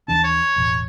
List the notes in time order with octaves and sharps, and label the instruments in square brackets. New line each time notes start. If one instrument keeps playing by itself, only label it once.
[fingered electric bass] D#2 E3 D4 [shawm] A5
[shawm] C#5
[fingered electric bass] E1 A1